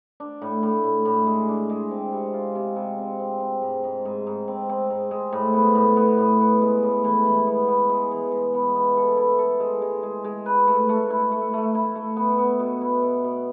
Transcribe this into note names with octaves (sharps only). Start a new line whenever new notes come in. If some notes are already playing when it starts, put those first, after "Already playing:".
D4
A2
A2
A2
A2
G#3
D4
G#3
C4
C3
F4
C3
C3
C4
C4
C4
G#2
G#2
G#2
G#2
C4
C4
G#2
G#3
A2
B3
A2
B3
A2
B3
G#3
A2
E3
E3
B3
B3
G#3
E3
G#3
B3
B3
A4
E4
A4
G#3
G#3
G#3
G#3
B4
A3
A3
E4
A3
A3
E4
A3
B3
B3
B2
E4
B2
B2